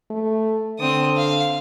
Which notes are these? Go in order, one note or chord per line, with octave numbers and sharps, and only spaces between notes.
A3
D3 C4 D#6
F5